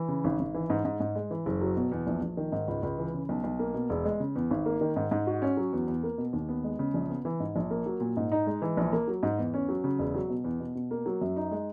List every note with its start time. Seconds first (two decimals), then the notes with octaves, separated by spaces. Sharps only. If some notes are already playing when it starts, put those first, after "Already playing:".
Already playing: E3
0.08 C#3
0.24 G#1
0.39 G#1
0.54 E3
0.70 G#2
0.85 G#2
1.00 G#2
1.15 G#3
1.31 E3
1.46 F#1
1.61 F#3
1.77 B2
1.92 E2
2.07 A#1
2.22 A#1
2.37 D#3
2.52 G#2
2.68 C#2
2.83 C#2
2.98 E3
3.14 C#3
3.29 B1
3.44 B1
3.59 A#3
3.74 B2
3.90 E1
4.05 G#3
4.20 C#3
4.36 E2
4.51 G#1
4.66 A#3
4.81 D#3
4.96 G#2
5.11 G#2
5.27 F#4
5.42 C#4
5.57 F#3
5.73 E2
5.87 E2
6.03 A#3
6.18 B2
6.33 D#2
6.49 B3
6.64 G#3
6.79 C#3
6.94 A#1
7.09 B3
7.25 E3
7.40 G#2
7.56 A#1
7.71 A#3
7.86 F#3
8.00 A#2
8.17 G#2
8.32 D#4
8.47 G#3
8.62 E3
8.77 A#1
8.93 A#3
9.08 F#3
9.23 G#2
9.38 E2
9.54 C#4
9.69 F#3
9.84 C#3
9.99 E1
10.14 F#3
10.30 B2
10.44 E2
10.60 B2
10.75 B2
10.91 A#3
11.06 F#3
11.21 F#2
11.36 D#4
11.51 G#3